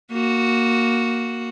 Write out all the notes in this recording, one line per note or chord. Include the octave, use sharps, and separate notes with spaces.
A#3 F#4